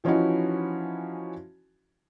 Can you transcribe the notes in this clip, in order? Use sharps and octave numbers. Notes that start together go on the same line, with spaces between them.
E3 F3 C#4 D#4 E4 F#4